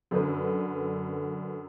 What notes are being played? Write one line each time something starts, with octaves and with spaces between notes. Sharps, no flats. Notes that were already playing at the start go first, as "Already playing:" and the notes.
F#2 D3 B4